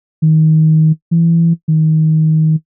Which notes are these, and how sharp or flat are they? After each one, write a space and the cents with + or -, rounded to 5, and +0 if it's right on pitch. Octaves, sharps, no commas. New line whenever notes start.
D#3 +20
E3 +20
D#3 +20